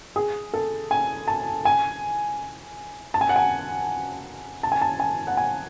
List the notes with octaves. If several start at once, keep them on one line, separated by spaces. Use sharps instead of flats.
G#4
A4
G#5
A5
G#5
A5
G#5
F#5
G#5
A5
G#5
A5
G#5
F#5
G#5